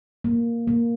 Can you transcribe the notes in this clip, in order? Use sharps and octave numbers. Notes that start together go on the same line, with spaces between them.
A#3
A#3